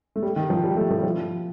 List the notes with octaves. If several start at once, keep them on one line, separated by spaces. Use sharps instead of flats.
A3
G3
D#3
F3
G3
A3
F3
G3
F3